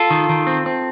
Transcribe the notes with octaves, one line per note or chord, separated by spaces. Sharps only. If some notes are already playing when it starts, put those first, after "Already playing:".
Already playing: F4 A4
D#3
D#3
C4
C4